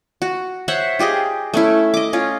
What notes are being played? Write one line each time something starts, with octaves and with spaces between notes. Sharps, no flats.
F#4
C5 C#5 E5 F#5
F4 G4 G#4 D#5
A3 C#4 E4
D#5 D6
C#4 F4